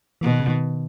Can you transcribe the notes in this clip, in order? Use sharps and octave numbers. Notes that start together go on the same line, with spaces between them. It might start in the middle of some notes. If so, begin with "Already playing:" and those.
B2 E3
D#3
C#3
D#3